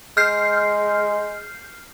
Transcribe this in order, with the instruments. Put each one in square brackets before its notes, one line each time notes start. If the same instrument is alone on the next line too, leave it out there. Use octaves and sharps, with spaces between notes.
[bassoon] G#3 [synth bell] F6 G6 C7